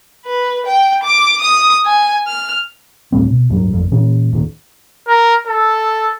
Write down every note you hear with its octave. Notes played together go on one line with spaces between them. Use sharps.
B4
G5
D6
D#6
G#5
F6
D2 A2 G3 C4
B2
D1 G2 F#3
G#1 F2
A#2 E3 C#4
D#1 A#2 D#3
A#4
A4